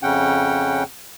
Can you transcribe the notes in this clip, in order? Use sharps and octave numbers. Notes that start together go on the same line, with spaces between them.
F2 C#3 C#4 F#5 G5